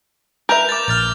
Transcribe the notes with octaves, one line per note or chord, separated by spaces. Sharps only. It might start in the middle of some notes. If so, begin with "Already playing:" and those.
A#4 B4 E5 G6 F7
D6 G6 A6
A#1 F6 A6 F7